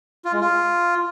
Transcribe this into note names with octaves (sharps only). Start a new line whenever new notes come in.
F4
G#3
F4